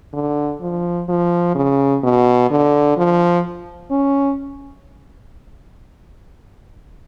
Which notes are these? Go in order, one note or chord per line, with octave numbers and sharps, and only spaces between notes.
D3
F3
F3
C#3
B2
D3
F3
C#4